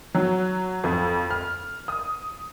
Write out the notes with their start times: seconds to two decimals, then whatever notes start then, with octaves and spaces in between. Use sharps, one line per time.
0.14 F#3
0.84 F2
1.30 F6
1.88 D#6